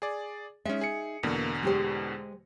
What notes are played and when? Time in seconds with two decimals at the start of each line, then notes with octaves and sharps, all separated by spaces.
0.02 G#4 D5
0.65 G#3 C#4 D#4 E5
0.81 G#4 C#7
1.23 E2 B2 D3 A#3
1.63 G#3 G4 C5